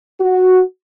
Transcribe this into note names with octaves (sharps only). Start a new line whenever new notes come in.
F#4